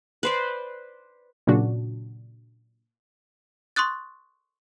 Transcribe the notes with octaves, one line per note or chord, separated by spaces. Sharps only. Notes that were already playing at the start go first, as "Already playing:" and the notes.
B4 C5 D5
A#2 C#3 F#3 D4 F#4
C6 C#6 D#6 F#6 A6